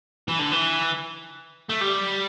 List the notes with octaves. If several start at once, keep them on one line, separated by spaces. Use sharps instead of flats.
E3
D3
E3
A3
G3